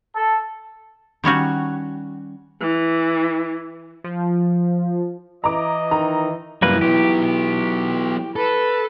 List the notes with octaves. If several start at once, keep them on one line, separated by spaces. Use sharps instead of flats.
A4
D#3 G3 C#4 F#4
E3
F3
E3 D#5 A#5 D6
D#3 A#5
F#2 C3 E3 G3 A#3 B4
F#3 B3 G4
A4 B4